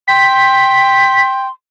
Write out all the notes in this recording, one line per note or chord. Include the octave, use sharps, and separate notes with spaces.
G5 C6 B6